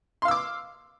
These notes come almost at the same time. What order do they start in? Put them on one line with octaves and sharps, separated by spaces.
C6 F5 E6 D6